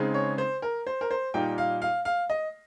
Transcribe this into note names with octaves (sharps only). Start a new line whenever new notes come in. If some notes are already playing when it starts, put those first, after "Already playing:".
Already playing: C#3 G#3 C4 D#4
C#5
C5
A#4
C5
A#4
C5
A#2 G3 A#3 D#4 G5
F5
F5
F5
D#5